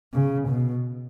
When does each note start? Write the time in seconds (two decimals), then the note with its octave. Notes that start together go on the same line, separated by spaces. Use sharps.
0.14 C#3
0.48 B2